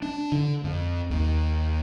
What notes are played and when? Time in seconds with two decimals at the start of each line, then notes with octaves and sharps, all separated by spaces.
0.02 D4
0.32 D3
0.64 F2
1.10 D#2